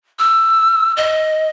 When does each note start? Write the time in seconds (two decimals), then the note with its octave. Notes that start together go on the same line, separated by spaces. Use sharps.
0.19 E6
0.97 D#5